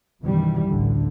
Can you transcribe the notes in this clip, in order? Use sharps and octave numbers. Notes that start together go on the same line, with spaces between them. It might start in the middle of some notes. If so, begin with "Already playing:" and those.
F#2 B2 D#3 E3 G3
A1 D2 D3